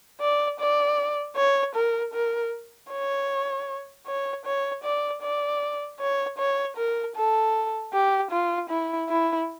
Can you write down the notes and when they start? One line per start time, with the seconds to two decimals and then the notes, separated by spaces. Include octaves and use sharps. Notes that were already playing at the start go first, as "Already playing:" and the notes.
0.21 D5
0.60 D5
1.36 C#5
1.75 A#4
2.14 A#4
2.91 C#5
4.07 C#5
4.45 C#5
4.84 D5
5.22 D5
6.00 C#5
6.38 C#5
6.77 A#4
7.16 A4
7.93 G4
8.31 F4
8.70 E4
9.09 E4